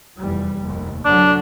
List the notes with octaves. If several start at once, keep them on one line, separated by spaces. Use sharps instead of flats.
F1 E2 G3
F1 D#2
D3 F#3 D4